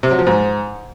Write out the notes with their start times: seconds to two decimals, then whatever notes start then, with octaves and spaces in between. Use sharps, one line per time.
0.03 C3
0.11 F#3
0.19 F3
0.27 G#2